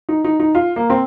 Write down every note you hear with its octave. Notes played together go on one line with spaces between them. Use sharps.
D#4
D#4
D#4
F4
A#3
C4